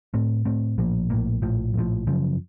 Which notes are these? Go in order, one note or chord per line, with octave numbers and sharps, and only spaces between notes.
A2 A3 C4
A2 A3 C4
A#1 A2 F3 A#3
A#1 A2 F3 A#3
A#1 A2 F3
A#1 A2 F3
F#1 F#2 C#3 F3